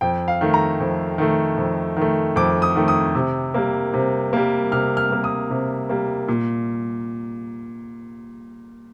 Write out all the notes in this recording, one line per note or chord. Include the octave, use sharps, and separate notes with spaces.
F2 G5
F5
D#3 A3
A#5
F2
D#3 A3
F2
D#3 A3
F2 D6
D#6
D#3 A3
D#6
C3
G3 A#3
C3
G3 A#3
C3 F6
F6
G3 A#3
D#6
C3
G3 A#3
A#2